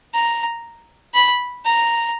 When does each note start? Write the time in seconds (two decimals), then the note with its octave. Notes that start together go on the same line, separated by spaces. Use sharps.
0.14 A#5
1.14 B5
1.65 A#5